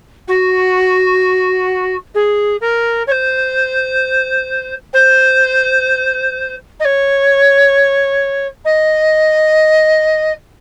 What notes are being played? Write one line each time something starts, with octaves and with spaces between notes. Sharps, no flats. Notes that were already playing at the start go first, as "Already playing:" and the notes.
F#4
G#4
A#4
C#5
C5
C5
D#5
C#5
D#5